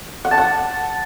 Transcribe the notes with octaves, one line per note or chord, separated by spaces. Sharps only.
F#5
A5
F#5